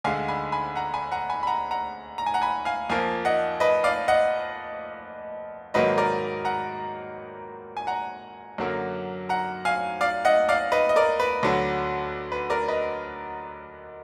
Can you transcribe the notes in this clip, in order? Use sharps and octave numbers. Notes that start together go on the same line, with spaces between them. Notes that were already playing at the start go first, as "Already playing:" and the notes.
D2 D3 G#3 F5 G#5
G#5 B5
G#5 B5
F#5 A#5
G#5 B5
F#5 A#5
G#5 B5
B5
F#5 A#5
F#5 A#5
A#5
G#5
F#5 A#5
G#5 B5
F5 G#5
F2 F3 A#3 F5 G#5
D#5 F#5
B4 D#5
D5 F5
D#5 F#5
G#2 D#3 F#3 A#3 B4 D#5
A#4 D5
F#5 A#5
G#5
F#5 A#5
F#2 D3 F#3 A#3
F#5 A#5
F5 G#5
D5 F5
D#5 F#5
D5 F5
B4 D#5
D#5
A#4 D5
B4
D2 D3 F#3
B4
A#4 D5
B4 D#5